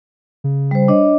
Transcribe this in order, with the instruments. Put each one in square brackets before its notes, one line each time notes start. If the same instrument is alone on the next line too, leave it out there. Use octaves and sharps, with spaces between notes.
[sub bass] C#3
[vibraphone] G3 C5
D4 C#5 D#5